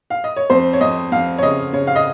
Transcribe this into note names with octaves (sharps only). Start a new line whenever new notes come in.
F5
D#5
C#5
F2 C5
C#5
F2 D#5
F2 F5
C#5
C#3 D#5
C#3 C#5
F5
D#5